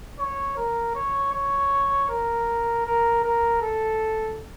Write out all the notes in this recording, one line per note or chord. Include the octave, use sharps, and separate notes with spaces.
C#5
A#4
C#5
C#5
A#4
A#4
A#4
A4